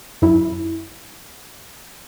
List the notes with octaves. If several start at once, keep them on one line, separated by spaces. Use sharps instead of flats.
F#2 E4